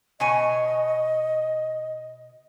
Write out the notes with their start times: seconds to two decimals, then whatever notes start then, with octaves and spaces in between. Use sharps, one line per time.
0.20 B2 C#5 D#5 G#5